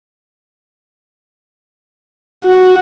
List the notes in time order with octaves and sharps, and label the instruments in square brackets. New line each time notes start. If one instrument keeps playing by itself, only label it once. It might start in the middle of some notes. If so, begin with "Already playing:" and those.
[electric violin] F#4